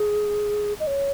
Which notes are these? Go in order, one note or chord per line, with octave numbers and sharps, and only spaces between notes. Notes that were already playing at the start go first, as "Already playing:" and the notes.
Already playing: G#4
D#5
C#5